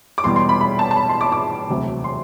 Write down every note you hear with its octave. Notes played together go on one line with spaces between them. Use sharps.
D6
E2 B2 G3 C6
C6
B5
B5
A5
A5
B5
C6
D6
D6
E1 D2 C3 F#3
C6